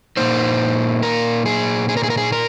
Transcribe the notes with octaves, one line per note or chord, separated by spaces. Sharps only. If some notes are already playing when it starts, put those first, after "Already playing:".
A#2 A#3 D#4 C5
A#4
G#4
G#4
A#4
G#4
A#4
G#4
A#4